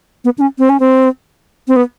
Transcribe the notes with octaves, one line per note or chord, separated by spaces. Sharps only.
B3
D4
C#4
C4
C#4
C4
C4
B3